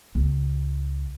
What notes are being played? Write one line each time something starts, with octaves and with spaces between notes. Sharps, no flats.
C#2